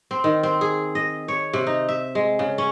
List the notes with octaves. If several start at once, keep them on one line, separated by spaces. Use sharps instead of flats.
C4
D#3
C4
G#4
D#5
C#5
C3
D#4
E5
G#3
C#3
C#4